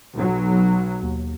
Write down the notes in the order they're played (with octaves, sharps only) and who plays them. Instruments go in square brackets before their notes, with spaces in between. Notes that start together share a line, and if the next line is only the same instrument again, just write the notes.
[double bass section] B1 F#3
[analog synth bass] D#2